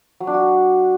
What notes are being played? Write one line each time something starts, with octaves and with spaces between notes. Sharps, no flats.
F#3
D4
F#4